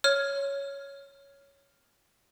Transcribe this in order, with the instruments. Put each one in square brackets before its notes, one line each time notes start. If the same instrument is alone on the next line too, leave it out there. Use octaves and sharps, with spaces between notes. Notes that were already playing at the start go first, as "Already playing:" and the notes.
[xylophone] C#5 F6